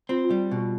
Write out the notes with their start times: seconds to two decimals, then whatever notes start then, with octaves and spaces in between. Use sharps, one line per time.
0.09 C4 F4
0.25 F4
0.30 G3
0.51 B2 G4